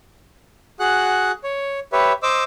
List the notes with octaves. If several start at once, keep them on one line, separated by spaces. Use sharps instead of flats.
F#4 G#4 F#5 F#6
C#5
G4 B4 C#5 E5
C5 D#5 D6 E6